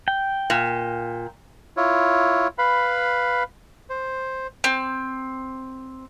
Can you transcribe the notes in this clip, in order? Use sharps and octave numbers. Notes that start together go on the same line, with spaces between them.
G5
A#2
E4 F4 C#5
B4 F5 B5
C5
C4